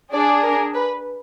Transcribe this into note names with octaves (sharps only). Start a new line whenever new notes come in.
D4 G#4 D5
A#4
B4